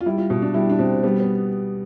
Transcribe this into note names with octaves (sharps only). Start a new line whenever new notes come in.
F4
G3 E4
F4
B2
D4
G3 E4
D4
B2 C4
G3 B3
B3